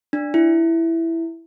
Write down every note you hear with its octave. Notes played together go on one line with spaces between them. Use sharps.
D4
E4